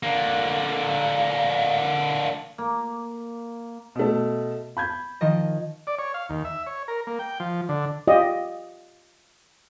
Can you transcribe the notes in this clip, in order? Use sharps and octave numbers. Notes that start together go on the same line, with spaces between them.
D3 A#3
A#3
B2 A3
B5 G6 G#6
D#3 F3 D#5
D5
C#5
F5
D#2
E5
C#5
A#4
A#3
G5
F3
D3
F4 G4 D5 D#5